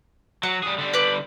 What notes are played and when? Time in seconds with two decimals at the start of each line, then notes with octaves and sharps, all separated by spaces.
0.43 F#3 F#5
0.63 G3 G#4
0.78 D3 G3
0.93 B4 D5